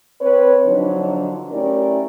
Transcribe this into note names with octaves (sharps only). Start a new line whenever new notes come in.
C4 B4 C#5
D3 F3 F#3 D4 D#4
A3 C#4 E4 G4 A#4 D5